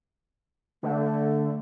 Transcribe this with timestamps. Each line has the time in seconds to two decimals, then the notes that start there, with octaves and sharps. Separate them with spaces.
0.83 D3 A3